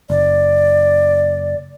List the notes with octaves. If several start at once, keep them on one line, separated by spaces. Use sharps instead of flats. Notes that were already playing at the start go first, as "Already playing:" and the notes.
F#1 D5